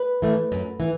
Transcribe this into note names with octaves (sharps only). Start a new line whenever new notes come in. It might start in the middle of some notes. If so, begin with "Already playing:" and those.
Already playing: B4
E3 A3
F#2
E3